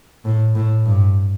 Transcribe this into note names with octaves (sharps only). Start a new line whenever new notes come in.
A2
A2
G2